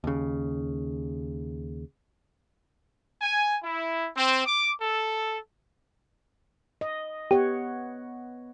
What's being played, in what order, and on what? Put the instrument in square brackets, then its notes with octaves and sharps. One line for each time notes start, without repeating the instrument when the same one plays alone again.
[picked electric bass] D#2 C#3
[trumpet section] G#5
E4
C4
D6
A4
[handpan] D#5
[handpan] B3 C#5 F#5 [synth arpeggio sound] G4